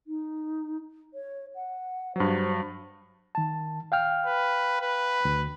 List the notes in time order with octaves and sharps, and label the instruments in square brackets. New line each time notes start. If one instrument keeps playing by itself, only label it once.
[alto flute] D#4
C#5
F#5
[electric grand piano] G2 F#3 [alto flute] C5
[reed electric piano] D#3 A5
F5 G5 F6
[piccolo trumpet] B4
B4
[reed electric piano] D2